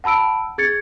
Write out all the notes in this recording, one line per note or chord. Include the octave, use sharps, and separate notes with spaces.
F#5 A5 B5 E6 D7
G#4 G#6 A6 C#7